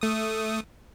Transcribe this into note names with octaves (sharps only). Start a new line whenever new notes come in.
A3 D#6